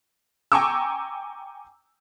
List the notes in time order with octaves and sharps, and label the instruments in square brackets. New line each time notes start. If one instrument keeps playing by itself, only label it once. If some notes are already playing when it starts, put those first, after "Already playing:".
[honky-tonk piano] G5 G#5 A#5 C#6 D6 E6